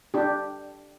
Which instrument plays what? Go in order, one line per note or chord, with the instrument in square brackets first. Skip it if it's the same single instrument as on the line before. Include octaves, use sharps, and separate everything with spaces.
[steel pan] D4 G4